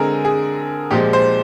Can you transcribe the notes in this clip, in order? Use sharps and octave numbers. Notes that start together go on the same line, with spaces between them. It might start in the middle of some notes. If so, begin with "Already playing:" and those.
Already playing: D3 G#3 C4 G#4 A#4
G#4
A#2 F3 G#3 G4
C5